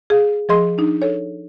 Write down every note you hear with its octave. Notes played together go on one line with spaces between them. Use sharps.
G#4 F5
F3 G#4 D#5 C6
D4 D#4
A4 C#5